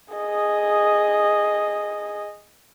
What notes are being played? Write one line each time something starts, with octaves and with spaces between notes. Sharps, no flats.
G#4 D#5